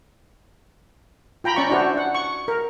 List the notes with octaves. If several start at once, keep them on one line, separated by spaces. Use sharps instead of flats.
F4 G5 A#5 B5
C#4 D5 A#5 C#6
D4 E4 F#4 C5
F#5
C#6
A#4